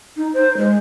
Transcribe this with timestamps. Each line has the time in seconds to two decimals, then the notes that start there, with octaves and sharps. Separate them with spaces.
0.17 D#4
0.34 C5
0.57 G#3